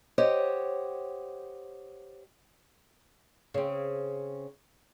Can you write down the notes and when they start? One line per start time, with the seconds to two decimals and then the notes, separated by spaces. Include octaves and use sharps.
0.18 G4 C5 C#5 D#5 F#5 G5
3.54 C#3 C4